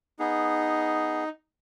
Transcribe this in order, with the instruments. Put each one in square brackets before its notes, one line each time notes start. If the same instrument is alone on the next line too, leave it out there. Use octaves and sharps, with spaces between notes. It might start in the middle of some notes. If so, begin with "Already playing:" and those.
[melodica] B3 G#4 [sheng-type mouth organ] D#4